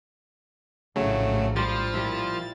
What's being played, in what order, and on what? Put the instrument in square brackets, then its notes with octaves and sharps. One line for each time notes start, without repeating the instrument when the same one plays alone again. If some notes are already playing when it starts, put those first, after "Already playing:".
[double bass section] A#1 A2 [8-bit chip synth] C#3 F#3 A3
[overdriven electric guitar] F3 [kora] G3 C5 [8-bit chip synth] A6
[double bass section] A#2 [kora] G3 E4